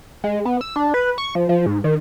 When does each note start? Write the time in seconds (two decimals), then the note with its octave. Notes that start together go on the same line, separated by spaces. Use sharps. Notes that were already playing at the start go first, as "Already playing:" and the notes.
0.24 G#3
0.45 B3
0.61 E6
0.76 D4
0.94 B4
1.18 C#6
1.35 F3
1.49 F3
1.66 G#2
1.84 D#3